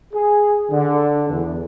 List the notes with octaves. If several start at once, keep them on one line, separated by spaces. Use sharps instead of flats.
G#4
D3
E2